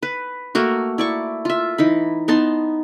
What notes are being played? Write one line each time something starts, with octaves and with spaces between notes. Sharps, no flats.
B4
A3 A#3 F#4
E4 D5 C#6
F4 E5
E3 D#4 B5
B3 D#4 A5 C6